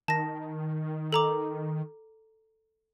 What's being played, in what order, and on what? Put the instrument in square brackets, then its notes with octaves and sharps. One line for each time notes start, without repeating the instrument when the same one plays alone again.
[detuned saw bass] D#3 [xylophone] A5 A#6
[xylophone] A4 A#5 D6